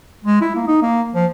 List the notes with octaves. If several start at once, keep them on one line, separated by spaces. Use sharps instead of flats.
G#3
E4
A#3
D#4
A#3
F3